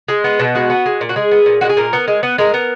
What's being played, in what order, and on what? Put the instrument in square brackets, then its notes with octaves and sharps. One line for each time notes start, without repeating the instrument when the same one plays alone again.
[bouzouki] G#3
B3
B2
G#3 F#4
B3
G#3
A#2
F#4
G#3 G#4
B3
A#2
G#3 F#4
G#4
A#2 A#4
B3
G#3
B3
G#3 A#4
B3